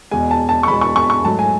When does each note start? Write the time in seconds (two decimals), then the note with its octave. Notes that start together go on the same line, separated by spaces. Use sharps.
0.11 E2 B2 G#3 G#5
0.31 A5
0.49 A5
0.63 C#6
0.67 E2 B2 G#3 B5
0.81 C#6
0.96 C#6
1.10 C#6
1.24 G#2 F#3 A3 A5
1.39 G#5